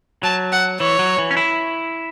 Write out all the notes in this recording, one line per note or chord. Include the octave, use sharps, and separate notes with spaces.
F#3 A5
F#5
E3 C#5
F#3
E3
C#4
E4